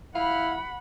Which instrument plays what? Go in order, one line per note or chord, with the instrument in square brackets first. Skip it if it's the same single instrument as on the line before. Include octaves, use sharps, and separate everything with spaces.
[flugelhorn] E4 [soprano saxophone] F5 [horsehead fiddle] F#5 B5